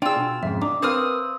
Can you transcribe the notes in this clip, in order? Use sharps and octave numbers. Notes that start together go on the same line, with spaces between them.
D4 F4 G#4 G5 E6
B2
F2 G#2 C#3 E5
D4 D#5 A#5 D6
C4 A#4 B4 F5 D#6 F6